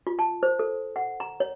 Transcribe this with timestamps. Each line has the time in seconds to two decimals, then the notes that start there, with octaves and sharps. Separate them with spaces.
0.07 F4
0.19 A5
0.43 C5
0.59 A4
0.96 F#5
1.20 A#5
1.40 C#5